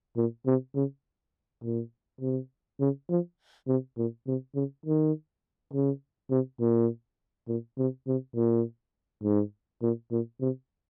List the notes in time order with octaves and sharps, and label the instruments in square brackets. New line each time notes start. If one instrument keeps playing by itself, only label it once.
[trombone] A#2
C3
C#3
A#2
C3
C#3
F3
C3
A#2
C3
C#3
D#3
C#3
C3
A#2
A#2
C3
C3
A#2
G#2
A#2
A#2
C3